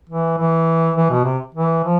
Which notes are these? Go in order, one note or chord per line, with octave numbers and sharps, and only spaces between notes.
E3
E3
E3
B2
C3
E3
F3